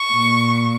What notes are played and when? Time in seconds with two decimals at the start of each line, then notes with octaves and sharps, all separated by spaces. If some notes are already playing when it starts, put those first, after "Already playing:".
Already playing: C#6
0.13 A#2